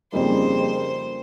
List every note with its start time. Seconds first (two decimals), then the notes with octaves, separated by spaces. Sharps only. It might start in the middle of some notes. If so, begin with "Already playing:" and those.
0.12 F2 C#3 G3 A#3 D#4 C5
0.62 A#4